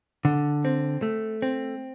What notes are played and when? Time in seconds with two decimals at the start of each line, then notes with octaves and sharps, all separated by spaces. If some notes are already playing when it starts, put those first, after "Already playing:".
0.25 D3
0.65 C4
1.02 A3
1.42 C4